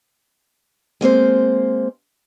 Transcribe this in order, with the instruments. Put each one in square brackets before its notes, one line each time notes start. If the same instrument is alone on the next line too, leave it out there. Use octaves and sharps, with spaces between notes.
[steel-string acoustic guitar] G#3 A#3 C4 C5